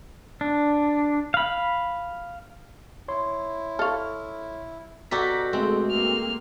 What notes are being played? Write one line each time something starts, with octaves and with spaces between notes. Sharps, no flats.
D4
F5 B5
E4 C#5 C6
A4 F5 C#6 F6
B2 F#4 G4 A4 D5 A#5 B6
G#3 A3 C4
A#3 F6